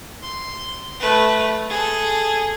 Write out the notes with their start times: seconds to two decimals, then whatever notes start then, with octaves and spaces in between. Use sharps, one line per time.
0.22 C6
0.99 A3 B4
1.69 G#4 A4